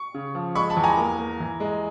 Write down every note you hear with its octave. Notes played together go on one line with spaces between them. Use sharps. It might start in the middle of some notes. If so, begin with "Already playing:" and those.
Already playing: C#6
C#3
F3
G#3 B5 C#6
A5 B5
E2
G#5 A#5
A#3
A#3
E3
G#3